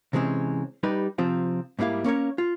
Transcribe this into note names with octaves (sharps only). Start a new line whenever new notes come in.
C3 E3 G#3 C4 C#4
G3 D#4 G4 B4
C3 F3 C4 F4
G#2 G3 A#3 E4 F5
A#3 C#4 A#4 C#5
F4